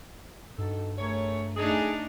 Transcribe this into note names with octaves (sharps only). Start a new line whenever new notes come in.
G2 D#4 F#4 A4
A3 G#4 A#4 C#5
A3 D4 D#4 G#4